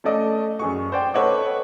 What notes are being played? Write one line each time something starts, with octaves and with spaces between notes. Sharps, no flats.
A3 C#4 A4 D5 D#5
F#2 G#4 C#6
C5 D5 G5
A4 B4 C#5 D#5 F#5 D6